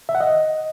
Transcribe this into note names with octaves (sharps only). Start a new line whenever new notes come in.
E5
F#5
D#5